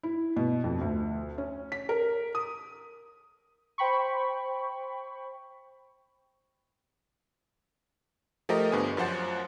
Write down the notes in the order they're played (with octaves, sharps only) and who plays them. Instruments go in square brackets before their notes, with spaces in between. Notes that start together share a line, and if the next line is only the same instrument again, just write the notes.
[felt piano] E4
B2
F2
D2
C#4
B6
A#4
D#6
[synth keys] C5 G5 B5 C#6
[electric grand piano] F3 A3 G4 A#4 D#5
G2 D3 B3 G#5
F#2 F3 C5 F#5 A6